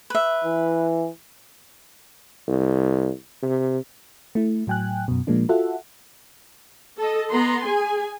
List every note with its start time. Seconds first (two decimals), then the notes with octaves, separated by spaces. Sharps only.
0.10 B4 E5
0.44 E3
2.48 C2
3.42 C3
4.35 A3 E4
4.67 A2 F#3 G5 G#5 F#6
5.08 F#2 B2
5.27 A#2 F3 G#3 A#3 D4
5.49 F4 F#4 A4 E5 F#5
6.99 A4 D#5
7.32 B3 A#5 C6
7.65 G#4 G#5